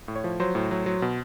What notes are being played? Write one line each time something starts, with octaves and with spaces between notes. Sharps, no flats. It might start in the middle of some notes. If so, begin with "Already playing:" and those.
A2
C#5
F3
F#3 C5
A2
F#3
F#3
B2